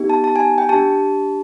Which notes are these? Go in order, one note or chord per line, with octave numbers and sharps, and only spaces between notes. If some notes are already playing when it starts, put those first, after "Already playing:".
Already playing: B3 D#4 G4
A5
A5
G#5
G5
D4 G4 A5